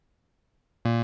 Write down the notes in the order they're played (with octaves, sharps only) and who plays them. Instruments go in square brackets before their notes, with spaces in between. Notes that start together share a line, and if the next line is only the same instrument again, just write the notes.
[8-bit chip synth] A#2